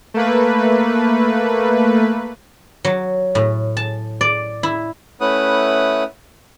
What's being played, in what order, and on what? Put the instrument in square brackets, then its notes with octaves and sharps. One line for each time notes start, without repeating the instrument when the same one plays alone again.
[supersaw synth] A3 A#3 B4
[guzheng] F#3
A2
A5
D5
E4
[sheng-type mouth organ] A3 C#4 E4 B4 F#5 D#6